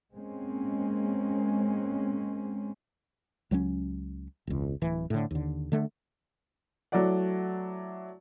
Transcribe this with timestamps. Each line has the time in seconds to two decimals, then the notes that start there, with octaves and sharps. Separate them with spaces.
0.14 G#3 A#3 C4 C#4
3.51 C#2 F#3 G3 C#4
4.47 E1 C#2
4.82 D1 E3
5.10 A2 D3
5.31 D#2 D3
5.72 D3 A3
6.92 F#3 A3 E4 D5 F#5